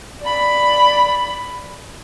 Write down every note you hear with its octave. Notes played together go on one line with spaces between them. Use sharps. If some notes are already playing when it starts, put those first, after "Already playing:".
D5 B5